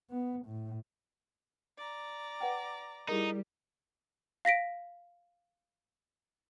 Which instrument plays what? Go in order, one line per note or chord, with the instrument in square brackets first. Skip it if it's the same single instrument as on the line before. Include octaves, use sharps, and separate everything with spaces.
[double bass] B3
A2
[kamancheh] D5 A#5
[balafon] B4 F#5 G5
[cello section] G3 [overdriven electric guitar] D#4 [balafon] E4 G#4 A#4
[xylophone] F5 A#6 B6 D7